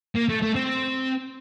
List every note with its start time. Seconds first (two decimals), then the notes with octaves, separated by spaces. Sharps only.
0.16 A#3
0.29 A3
0.42 A3
0.55 C4